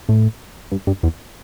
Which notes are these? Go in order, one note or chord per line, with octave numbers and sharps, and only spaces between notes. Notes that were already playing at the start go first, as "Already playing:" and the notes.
A2
G2
G2
E2